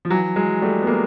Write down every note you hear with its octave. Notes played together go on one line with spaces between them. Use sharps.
F3
E3 F#3
F#3 G#3
G3 A3
B3
G#3 A#3